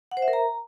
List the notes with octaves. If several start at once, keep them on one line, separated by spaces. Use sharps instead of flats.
F#5
C5
E5
A#4
A#5